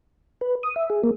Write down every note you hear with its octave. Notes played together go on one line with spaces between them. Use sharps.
B4
D#6
E5
G#4
A#3